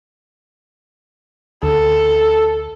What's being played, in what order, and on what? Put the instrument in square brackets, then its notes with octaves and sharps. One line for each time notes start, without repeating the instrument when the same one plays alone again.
[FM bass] D2 [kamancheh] A4